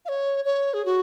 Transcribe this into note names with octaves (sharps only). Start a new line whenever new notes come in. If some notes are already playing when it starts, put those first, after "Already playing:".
F5
C#5
C#5
G#4
F#4